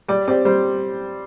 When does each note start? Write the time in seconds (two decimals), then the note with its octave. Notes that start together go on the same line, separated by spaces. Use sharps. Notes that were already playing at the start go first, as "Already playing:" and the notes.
0.08 G3 D5
0.28 C4 G4 D5
0.45 G3 C5